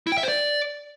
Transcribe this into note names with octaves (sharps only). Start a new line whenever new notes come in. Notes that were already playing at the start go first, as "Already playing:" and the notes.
E4
G5
E5
C5
D5